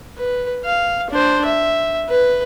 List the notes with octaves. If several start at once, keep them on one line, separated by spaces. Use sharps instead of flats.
B4
F5
D4 C5
E5
B4